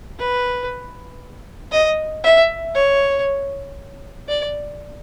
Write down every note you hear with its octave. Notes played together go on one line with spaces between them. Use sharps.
B4
D#5
E5
C#5
D5